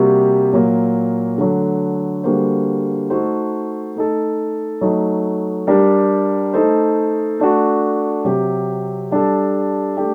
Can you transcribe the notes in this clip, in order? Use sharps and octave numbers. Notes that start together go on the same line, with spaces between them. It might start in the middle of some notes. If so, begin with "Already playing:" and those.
Already playing: C3 G3 A#3 F#4
A#2 F#3 A#3
D3 F#3 A3
D3 G3 A#3 F#4 C5
A3 D#4 F#4 A4 C5
A3 D#4 A4
F#3 A3 D#4
G3 D4 G4 A#4
A3 D#4 A4 C5
A3 D4 F#4
C3 F#3 C4 G4
G3 D4 A4
A3 D4 G4